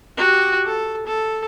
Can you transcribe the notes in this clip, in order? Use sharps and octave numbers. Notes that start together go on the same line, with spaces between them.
F#4 G4
A4
A4